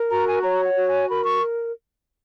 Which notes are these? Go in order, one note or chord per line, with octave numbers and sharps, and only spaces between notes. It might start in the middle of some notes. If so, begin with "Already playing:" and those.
Already playing: A#4
F#4 A#5
G#5
C#5 A#5
F#5
F#4
G#5
A#4 B5
C#6